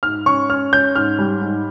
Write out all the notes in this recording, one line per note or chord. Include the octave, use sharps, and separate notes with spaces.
G#2 F6
C#4 C#6
C#4 F6
C#4 G6
G#2 F6
G3
G#2